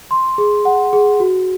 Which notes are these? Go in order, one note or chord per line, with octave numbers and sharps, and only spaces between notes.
C6
G#4
F#5
G#4
F#4